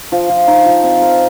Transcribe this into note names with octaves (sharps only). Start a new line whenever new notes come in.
F3
F3
D#4
F3
C4
A#4